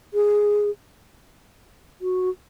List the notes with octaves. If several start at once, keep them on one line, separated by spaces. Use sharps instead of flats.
G#4
F#4